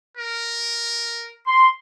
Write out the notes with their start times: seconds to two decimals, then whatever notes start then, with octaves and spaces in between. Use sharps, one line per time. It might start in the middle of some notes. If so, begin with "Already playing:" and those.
0.17 A#4
1.47 C6